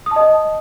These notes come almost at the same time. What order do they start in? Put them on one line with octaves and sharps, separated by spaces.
D#6 A5 D#5